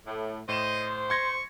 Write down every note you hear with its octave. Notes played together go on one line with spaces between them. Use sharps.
A2
A2 C5 D#5 E7
C6 C#6 G#6 A#6